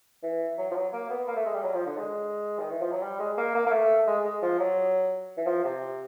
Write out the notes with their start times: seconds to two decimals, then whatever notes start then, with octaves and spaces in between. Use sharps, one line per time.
0.23 E3
0.58 F#3
0.71 F3
0.75 F#3
0.93 A#3
1.10 B3
1.28 A#3
1.36 A3
1.46 G#3
1.54 G3
1.63 F#3
1.74 F3
1.86 D3
1.98 G#3
2.59 D#3
2.70 E3
2.81 F3
2.92 F#3
3.03 G3
3.19 G#3
3.37 A#3
3.55 A#3
3.66 A#3
3.72 A3
4.07 G#3
4.25 G#3
4.42 F3
4.59 F#3
5.37 E3
5.47 F3
5.64 C3